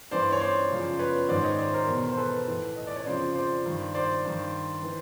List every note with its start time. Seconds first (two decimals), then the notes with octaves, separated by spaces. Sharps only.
0.11 G2 E3 C5 D5
0.32 C#5
0.40 C5 D5
0.70 F#2 C#3 F3
0.99 B4 C#5
1.29 G#2 D#3 C5 D5
1.44 C#5 D#5
1.58 C5 D5
1.73 A#4 C5
1.88 E2 B2
2.09 C5
2.17 A4 B4
2.47 A2 E3
2.76 D#5
2.87 D5
2.96 C#5
3.06 F2 C#3 F3 C5 D5
3.35 C5 D5
3.66 G2 D#3
3.94 C5 D5
4.25 G2 D#3
4.83 E3